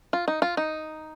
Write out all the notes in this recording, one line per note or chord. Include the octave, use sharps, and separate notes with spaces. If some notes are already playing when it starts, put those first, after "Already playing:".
F4
D#4
F4
D#4